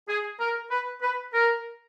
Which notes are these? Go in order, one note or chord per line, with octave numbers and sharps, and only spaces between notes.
G#4
A#4
B4
B4
A#4